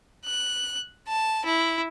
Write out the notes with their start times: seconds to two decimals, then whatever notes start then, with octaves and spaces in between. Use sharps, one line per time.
0.25 F#6
1.08 A5
1.46 E4